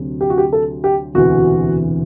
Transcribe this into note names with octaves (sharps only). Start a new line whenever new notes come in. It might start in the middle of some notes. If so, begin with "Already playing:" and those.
Already playing: D2 C3 F#3
G4
F#4
G4
A4
G4
E1 D2 C3 E3 F#4